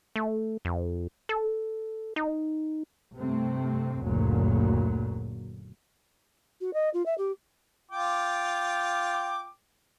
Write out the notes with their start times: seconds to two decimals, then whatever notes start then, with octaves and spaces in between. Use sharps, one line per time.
0.16 A3
0.65 F2
1.29 A4
2.16 D#4
3.17 G2 C3 A3 C4
4.02 F#1 D2 A#2 F#3
6.61 F#4
6.74 D#5
6.94 F4
7.06 E5
7.18 G4
7.91 F4 G5 D6